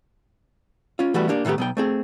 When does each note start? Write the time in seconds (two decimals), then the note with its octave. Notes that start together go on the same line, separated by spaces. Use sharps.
0.99 C#4 F4
1.14 E3 G3 A3 B3 F#4
1.29 A#3 D4 G4
1.45 A2 D#3 A3 B3 G4
1.58 B1 B3 G5
1.77 A3 C4 G#4